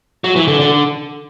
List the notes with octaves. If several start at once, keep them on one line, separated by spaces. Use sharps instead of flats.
F#3
E3
D3
D3